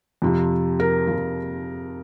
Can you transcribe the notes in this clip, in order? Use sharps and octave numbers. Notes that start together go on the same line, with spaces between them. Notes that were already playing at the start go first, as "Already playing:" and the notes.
F2 C3 F3
A#4
F2 C3 F3